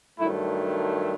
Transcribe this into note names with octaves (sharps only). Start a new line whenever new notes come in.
G2 D#3 F#3 A3 E4